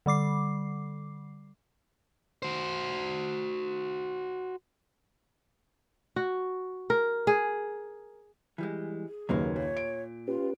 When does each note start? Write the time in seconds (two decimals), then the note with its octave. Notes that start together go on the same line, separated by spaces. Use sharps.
0.06 D3 G3 D6 C7
2.43 F#4 C5
6.16 F#4
6.90 A#4
7.27 G#4
8.58 E3 G3 G#3
9.08 G#4
9.29 F#1 D#2 F#3 A#3 C#4 B4
9.56 A#2 C#5
9.77 D7
10.28 C#4 F4 G4 B4